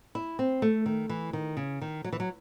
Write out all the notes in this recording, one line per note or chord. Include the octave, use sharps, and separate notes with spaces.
E4
C4
A3
D#3
E3
D#3
C#3
D#3
F#3
E3
F#3